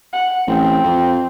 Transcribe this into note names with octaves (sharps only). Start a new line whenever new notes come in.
F#5
A1 C4
F2